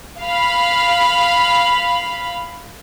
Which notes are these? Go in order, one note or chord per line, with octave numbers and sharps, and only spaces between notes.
F5 B5